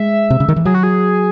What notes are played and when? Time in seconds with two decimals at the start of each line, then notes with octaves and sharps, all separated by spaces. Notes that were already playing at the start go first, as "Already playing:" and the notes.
Already playing: G#3 E5
0.30 C3
0.40 C#3
0.48 D#3
0.56 E3
0.65 F#3 G#4
0.74 F#4
0.83 G#4